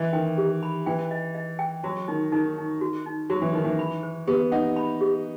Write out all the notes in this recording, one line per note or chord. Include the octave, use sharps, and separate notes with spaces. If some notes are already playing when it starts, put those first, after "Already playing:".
Already playing: E3 D#5
D#3 G5
G4
B5
E3 G5
D#5
D#5
G5
F#3 F#4
D#3 D#4
D#3 D#4
D#4
F#4
D#4
F#3 F#4
E3
D#3 D#4
E3
B5
C5
B3 G4
D#4 F#5
B5
G4